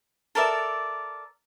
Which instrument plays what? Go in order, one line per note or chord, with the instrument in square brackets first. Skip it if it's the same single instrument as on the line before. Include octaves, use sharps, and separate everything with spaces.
[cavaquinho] A4 A#4 D5 E5